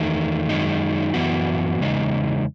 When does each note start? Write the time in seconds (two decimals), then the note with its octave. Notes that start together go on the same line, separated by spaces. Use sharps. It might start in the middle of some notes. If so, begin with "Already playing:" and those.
Already playing: E2 D#3 A3
0.49 F#2 D#3 G#3 D#4
1.14 F#2 E3 B3 F#4
1.79 E2 C#3 G#3 D#4